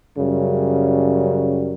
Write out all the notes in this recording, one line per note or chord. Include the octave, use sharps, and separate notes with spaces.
F#2 C#3 G3